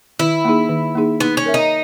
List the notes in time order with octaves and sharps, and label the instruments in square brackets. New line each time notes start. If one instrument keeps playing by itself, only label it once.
[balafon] D#3 [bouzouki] E4
[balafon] A#3 D#4 G#4
D#3
A#3 D#4 G#4
[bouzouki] B3 [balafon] D#4
[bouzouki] C#4
[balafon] A#4 C#5 E5
[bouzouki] D#4